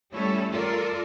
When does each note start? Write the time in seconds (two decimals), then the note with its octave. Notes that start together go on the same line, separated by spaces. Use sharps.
0.13 G3 A3 C#4 E4 A4 C#5
0.49 F4 A4 A#4 D5